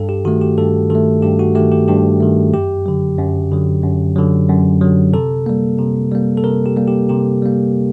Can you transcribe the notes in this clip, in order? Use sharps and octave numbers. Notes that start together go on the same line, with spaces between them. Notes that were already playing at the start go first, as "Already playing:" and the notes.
Already playing: G2 A4
G4
D#3 A3 F#4
G4
G2 A4
D#3 A3 A4
G2 G4
F#4
D#3 A3 G4
G4
G2 G4
D#3 A3
F#2 G4
D3 F#3
F#2
D3 F#3
F#2
D3 F#3
F#2
D3 F#3
C3 A4
G3 A#3
C3
G3 A#3
A4
C3 A#4
G4
G3 A#3
G4
C3 G4
G3 A#3